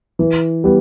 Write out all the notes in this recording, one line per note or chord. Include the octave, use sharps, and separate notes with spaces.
E3
G3 B3